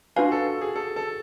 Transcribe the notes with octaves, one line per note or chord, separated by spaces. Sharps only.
D4 F4 F#4 B4 F5 G#5
A4
A4
G#4
A4
A4